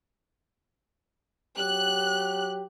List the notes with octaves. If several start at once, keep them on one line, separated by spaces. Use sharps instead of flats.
F#3 G4 F#6